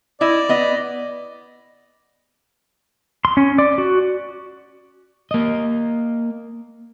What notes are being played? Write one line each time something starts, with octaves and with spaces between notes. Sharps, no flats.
E4 D5 D#5
B3 D#5
C6
C#4
D5
F#4
A#3 D#5